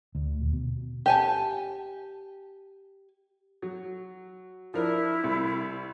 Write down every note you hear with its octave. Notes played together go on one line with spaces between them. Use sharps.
D2
D#1
B2
G4 G#5 A5
F#3
F3 D4 E4 A#4
C2